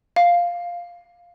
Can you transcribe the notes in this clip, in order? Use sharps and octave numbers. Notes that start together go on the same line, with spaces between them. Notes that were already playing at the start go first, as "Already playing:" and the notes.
F5